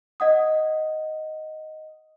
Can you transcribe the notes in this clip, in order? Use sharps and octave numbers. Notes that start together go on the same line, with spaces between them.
D#5 F#5 D#6